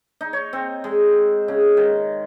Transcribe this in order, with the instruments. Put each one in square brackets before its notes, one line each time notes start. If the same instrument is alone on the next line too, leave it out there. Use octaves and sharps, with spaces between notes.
[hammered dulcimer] D#4
C#5
C4
G#3
C#3
D#3